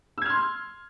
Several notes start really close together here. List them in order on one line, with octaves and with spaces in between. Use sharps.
E6 G#6 F6 C6